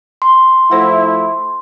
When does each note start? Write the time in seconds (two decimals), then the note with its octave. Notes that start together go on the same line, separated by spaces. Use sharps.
0.22 C6
0.71 F3 A3 E4 C5 F#5